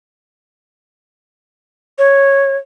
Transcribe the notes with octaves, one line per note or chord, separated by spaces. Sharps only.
C#5